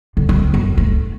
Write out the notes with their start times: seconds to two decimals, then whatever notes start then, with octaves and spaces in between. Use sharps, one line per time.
0.17 D3
0.29 C4
0.54 F#2
0.77 A3